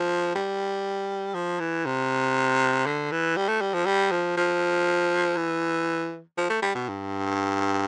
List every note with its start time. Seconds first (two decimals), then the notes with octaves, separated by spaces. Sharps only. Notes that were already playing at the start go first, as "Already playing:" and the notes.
Already playing: F3
0.35 G3
1.34 F3
1.60 E3
1.86 C3
2.86 D3
3.12 E3
3.37 G3
3.48 A3
3.61 G3
3.74 F3
3.86 G3
4.11 F3
4.37 F3
5.37 E3
6.38 F3
6.50 A3
6.62 G3
6.75 B2
6.88 G2